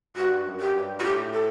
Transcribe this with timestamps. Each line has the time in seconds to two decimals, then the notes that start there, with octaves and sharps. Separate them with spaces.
0.16 G2 F#4
0.45 F#2
0.60 G4
0.74 G2
0.99 F#4
1.03 A2 G4
1.33 A4